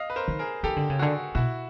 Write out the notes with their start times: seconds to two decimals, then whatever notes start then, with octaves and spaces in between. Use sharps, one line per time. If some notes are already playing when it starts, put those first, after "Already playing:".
Already playing: D#5 F5
0.10 B4
0.16 A#4 C5
0.28 D#3
0.39 G#4 A#4
0.63 D#3 G4 A4
0.76 D3
0.90 C#3
0.99 D3 F#4 G#4
1.35 B2 E4 F#4